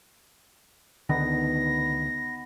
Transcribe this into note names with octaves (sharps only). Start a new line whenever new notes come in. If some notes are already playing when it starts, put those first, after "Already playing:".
C#2 D3 D#3 B3 D#4 A#6